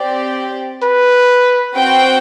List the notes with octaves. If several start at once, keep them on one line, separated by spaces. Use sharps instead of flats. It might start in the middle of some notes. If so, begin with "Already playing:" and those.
Already playing: C4 G4 D5
B4
C4 F#4 C5 G5